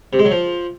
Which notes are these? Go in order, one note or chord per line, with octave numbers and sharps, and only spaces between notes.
C3
G#3
F#3
F3